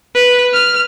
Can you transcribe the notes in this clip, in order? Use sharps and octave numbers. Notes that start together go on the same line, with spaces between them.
B4
F6